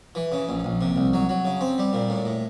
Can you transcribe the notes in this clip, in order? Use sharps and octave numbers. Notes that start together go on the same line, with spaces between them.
E3
C#3
A#1
A#1
C3
C2
F#3
F#3
C#3
C4
G3
A#2
A2
A2